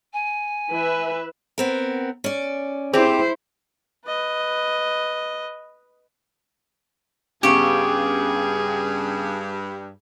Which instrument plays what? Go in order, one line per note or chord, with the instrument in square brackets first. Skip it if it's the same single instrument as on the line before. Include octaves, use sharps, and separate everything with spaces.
[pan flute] G#5
[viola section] E3 B4 E5
[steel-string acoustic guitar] B3 C4 A#4
C#4 D5
[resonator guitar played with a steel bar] C4 G4 [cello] E4 C5 [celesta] G#4
[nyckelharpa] B4 D#5
[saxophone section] G2 [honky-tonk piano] C#3 B3 [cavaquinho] G4 C#6 [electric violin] G#4